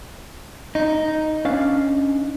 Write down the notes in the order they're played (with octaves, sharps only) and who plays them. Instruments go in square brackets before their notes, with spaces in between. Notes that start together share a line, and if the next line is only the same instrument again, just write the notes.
[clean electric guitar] D#4
[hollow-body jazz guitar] C#4 D4 F5